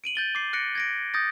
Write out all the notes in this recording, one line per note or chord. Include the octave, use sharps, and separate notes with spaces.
D7 D#7 F#7
G6 A6 G7
D6 C7
F#6 A#6 C#7 D7
G#6 A#6 D7
D#6 G6 A6 A#6